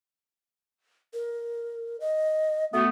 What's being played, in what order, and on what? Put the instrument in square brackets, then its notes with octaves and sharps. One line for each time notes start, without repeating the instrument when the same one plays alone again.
[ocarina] A#4
D#5
[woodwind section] A3 B3 [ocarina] F#4